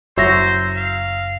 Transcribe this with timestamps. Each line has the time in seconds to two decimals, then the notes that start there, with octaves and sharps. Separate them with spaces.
0.17 F#1 F#3 C5 C#5 E5 E6 A#6
0.76 F5